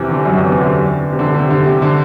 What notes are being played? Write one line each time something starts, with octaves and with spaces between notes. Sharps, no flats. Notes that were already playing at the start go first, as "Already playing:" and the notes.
Already playing: E2 C3 E3
D3
F#2 F#3
E2 E3
C3
D3
C3
D3
C3
D3
C3
D3